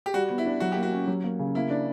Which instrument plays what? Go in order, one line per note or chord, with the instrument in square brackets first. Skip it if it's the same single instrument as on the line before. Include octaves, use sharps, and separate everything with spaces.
[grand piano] G4
[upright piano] G3 [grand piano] F#4
[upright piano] B3
[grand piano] E4
[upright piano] D4
[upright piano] F#3 [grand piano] F#4
[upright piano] A#3 [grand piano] G4
[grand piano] F#4
[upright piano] C#4
F#3
A#3
C#3
[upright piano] A#3 [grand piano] E4
[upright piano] D4